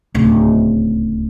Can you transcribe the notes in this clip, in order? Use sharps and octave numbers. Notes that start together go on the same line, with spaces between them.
D1 C#2